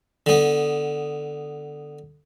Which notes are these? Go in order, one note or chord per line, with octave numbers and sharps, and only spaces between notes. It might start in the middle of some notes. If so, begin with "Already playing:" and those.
D3 B3